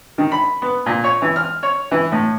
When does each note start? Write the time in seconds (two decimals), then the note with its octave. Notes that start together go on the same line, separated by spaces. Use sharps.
0.18 D#3
0.32 B5
0.62 B3
0.86 A#2
1.04 C#5
1.22 E3
1.36 F6
1.63 C#5
1.91 E3
2.12 A2